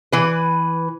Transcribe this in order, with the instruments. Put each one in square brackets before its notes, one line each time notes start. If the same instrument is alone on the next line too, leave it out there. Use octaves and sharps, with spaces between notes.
[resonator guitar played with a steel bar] E3 B4